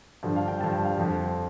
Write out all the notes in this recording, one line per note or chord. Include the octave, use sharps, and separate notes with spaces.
G2 D3 F3 G4
F5
G5
G2 D3 F3 A5
G5
F5
F2 D3 F3